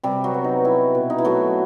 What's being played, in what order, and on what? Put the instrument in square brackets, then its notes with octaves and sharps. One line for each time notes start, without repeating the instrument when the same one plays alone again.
[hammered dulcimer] C3 G3 G4
F#3 F#4
B3
D#4
C4 E4
B2
D#4
E4
F#3 A3 F#4